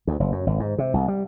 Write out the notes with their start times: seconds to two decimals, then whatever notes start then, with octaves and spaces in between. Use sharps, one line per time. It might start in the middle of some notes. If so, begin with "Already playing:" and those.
0.07 D2
0.20 F#1
0.32 F#2
0.47 G#1
0.60 G#2
0.78 C3
0.94 C2
1.08 G3